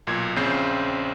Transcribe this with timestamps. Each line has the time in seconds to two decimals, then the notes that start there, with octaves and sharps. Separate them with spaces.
0.07 B1 A#2 G#6
0.36 A#1 C#3 C4 C5 G6 C7